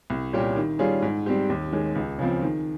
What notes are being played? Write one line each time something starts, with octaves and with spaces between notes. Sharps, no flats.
C2
A#2 G3 C#4 G4
D#3
G3 C#4 F4 G#4
G#2
G3 C4 G4 C5
D#2
D#3 G#3 C#4
C#2
C#3 F3 C4
D#3